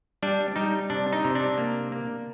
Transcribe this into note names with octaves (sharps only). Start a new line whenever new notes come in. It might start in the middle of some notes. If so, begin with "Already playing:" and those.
G3 D4
G3 D#4
C3 D4
D#4
C3
D4
A#3
A#3